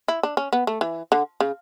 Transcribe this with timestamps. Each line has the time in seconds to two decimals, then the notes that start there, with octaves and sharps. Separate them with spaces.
0.08 E4
0.23 D4
0.37 C#4
0.53 B3
0.67 A3
0.81 E3
1.12 D3
1.40 C#3